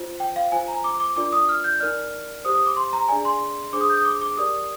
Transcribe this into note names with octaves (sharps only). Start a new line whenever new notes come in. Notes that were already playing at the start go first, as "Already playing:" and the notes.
Already playing: F4 C5
G5
F5
F4 C5 G#5
A#5
D6
D6
D4 F4 A#4 D5 D6
D#6
F6
G6
D#4 A#4 D5 F6
G4 C5 D#6
D#6
D6
C6
A#5
D4 G#4 D5 G#5
C6
D4 G#4 C5 D6
D#6
G6
D#6
D6
D6
G4 A#4 D5 D#6